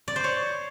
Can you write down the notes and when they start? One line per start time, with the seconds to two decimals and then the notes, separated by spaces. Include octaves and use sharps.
0.08 D5
0.16 C5
0.24 C#5